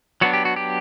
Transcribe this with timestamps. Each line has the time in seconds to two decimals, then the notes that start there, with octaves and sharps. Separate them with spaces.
0.21 F#3 B3 D4 F#4
0.33 G4
0.45 F#4
0.56 G4